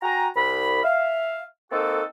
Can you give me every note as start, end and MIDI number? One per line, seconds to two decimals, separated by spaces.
0.02 0.28 66
0.02 0.28 79
0.02 0.28 80
0.02 0.28 82
0.35 0.80 36
0.35 0.80 83
0.83 1.43 76
0.83 1.43 77
1.72 2.03 58
1.72 2.03 60
1.72 2.03 63
1.72 2.03 66
1.72 2.03 69